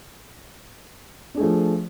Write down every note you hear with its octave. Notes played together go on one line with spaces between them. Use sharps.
F3 A3 D4 G#4